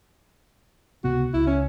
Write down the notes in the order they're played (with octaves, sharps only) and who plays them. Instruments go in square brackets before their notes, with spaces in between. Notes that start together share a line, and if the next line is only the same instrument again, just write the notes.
[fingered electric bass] C#2 C3 B3 [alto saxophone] F#4
[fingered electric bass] C#2 [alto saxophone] E4
[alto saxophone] C#4